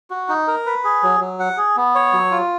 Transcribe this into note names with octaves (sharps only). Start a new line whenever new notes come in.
F#4
D#4
A#4
B4
G#4
F#3
F#3
F#5
G#4
B3
C#5
F#3
F4